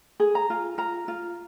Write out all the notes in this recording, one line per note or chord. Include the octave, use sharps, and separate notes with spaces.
G#4
A#5
F4
F4 A#5
F4